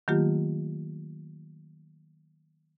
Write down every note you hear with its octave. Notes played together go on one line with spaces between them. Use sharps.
D#3 F#3 A3 A#3 F4 G4